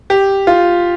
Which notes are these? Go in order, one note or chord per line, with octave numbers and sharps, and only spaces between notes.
G4
F4